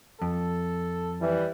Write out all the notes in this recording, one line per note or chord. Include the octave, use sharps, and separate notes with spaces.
F2 A4
E3 G3